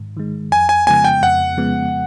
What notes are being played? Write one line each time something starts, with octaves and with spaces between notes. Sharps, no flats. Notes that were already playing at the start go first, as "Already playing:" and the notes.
Already playing: G#2 D#3
D#3 G#3
F2 G#5
G#5
C#3 F3 G#3 B3 G#5
G5
F2 F#5
C#3 F3 G#3 B3